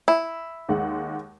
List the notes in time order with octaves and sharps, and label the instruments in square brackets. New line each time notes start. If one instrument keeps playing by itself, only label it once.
[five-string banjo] E4
[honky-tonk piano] D#2 G#3 F#5